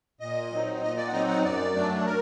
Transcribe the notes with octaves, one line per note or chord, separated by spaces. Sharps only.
A#2 D#5
F#3 C4 D#4
A#2 D#5
D5
F#5
F#3 C4 D#4 D#5
F#5
F#2 D5
F#3 A3 D4
A#4